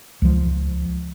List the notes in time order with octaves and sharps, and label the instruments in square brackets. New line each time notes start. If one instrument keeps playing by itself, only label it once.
[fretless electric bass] C#2 F3